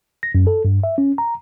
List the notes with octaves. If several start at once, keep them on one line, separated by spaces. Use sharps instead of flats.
A#6
F#2
A4
G2
E5
C#4
A#5